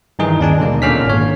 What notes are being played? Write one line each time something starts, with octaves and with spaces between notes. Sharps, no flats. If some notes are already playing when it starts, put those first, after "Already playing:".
G2 D#3 E3 D#4 G#4
D#2 C#4 D4 G#5
B2 D3 G#3 A#3 D#4
A#2 D3 A#3 C#4 F6 B6
G#1 C#5